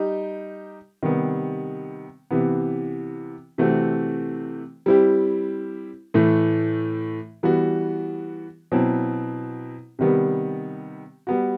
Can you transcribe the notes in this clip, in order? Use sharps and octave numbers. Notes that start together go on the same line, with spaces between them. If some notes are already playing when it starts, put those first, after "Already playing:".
Already playing: G3 D#4 G4
C3 D#3 G3 B3
C3 E3 B3
C3 E3 A3 C4 F#4
G3 C4 E4 G4
A2 E3 A3
E3 G3 B3 F#4
B2 F#3 C4 E4
C3 D#3 G3 B3
G3 B3 F#4